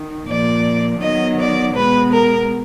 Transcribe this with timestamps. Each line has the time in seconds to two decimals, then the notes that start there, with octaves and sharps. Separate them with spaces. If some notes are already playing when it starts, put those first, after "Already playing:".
Already playing: D#3
0.27 A#2 F3 A#3 D5
1.01 D#3 F#3 B3 D#5
1.38 D5
1.74 B2 G#3 B3 B4
2.11 A#4